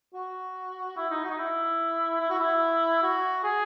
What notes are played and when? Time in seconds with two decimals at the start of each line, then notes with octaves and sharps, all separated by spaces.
0.14 F#4
0.96 E4
1.10 D#4
1.24 F#4
1.30 D#4
1.38 E4
2.20 E4
2.30 F#4
2.39 E4
3.02 F#4
3.43 G#4